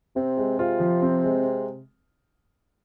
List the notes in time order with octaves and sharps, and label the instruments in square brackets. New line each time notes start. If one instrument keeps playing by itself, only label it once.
[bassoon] C3 [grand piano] C4
[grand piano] G#3
[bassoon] C3 [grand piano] F4
[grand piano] F3
C4
G#3